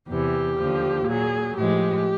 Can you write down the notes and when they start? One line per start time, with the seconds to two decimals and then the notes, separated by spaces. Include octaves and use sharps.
0.09 E2 C3 E3 G4
0.58 D#2 D3 F3
1.07 A#2 F#3 G#4
1.57 A2 F3 G#3 G4